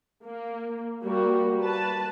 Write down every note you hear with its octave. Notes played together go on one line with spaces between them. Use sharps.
A#3
G3 A#3 F#4
B4 A5